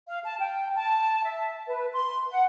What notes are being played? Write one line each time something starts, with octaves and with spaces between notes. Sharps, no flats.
F5
A5
G5
A5
E5
B4
C6
F#5